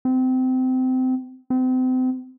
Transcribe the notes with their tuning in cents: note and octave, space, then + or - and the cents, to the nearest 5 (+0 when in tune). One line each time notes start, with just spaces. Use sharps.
C4 -25
C4 -35